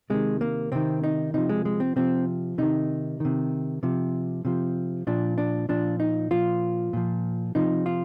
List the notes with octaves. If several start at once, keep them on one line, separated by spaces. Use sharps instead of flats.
C3 D#3 G#3
A#3
C3 D#3 C4
D#4
C3 F3 D#4
G#3
G#3
C4
C3 F3 C4
C3 D#3 D#4
C3 D#3
C3 F3
C3 F3
A#2 F3 D4
D4
A#2 F3 D4
D#4
A#2 F3 F4
A#2 F3
C3 F3 D#4
F4